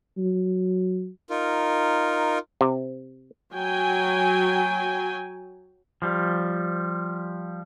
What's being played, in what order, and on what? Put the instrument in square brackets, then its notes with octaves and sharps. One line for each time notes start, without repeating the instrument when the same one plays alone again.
[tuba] F#3
[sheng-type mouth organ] D#4 F4 A#4
[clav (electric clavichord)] C3
[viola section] F#3 G5 G#5
[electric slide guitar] F3 G3